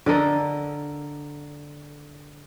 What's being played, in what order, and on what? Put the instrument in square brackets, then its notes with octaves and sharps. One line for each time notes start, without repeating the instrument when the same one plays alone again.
[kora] D3 A4 A#4 D#5